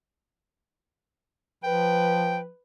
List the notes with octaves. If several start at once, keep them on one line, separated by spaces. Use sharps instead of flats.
F3 B4 G5